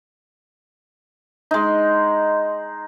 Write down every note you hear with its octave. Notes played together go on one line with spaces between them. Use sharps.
G#3 D#4